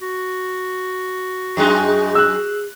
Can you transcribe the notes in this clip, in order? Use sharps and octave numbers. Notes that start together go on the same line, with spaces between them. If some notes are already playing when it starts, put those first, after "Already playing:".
F#4
F#2 G#3 D#4 G#4
E6 F#6